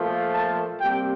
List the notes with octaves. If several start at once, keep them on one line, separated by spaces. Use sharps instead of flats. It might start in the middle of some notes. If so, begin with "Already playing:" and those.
Already playing: A#2 F3 A3
A5
C3 G3 A#3 G5